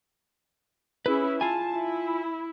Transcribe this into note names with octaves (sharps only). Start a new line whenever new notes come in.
C#4 E4 G#4 B4
F4 G#5 A5
E4